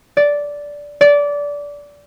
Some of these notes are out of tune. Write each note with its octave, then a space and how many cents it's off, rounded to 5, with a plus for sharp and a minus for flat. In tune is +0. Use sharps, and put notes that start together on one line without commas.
D5 -10
D5 -20